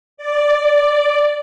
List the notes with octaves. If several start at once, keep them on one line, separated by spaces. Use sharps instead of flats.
D5